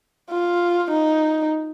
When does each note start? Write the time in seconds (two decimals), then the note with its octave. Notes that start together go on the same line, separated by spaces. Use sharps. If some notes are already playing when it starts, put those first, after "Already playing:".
0.31 F4
0.91 D#4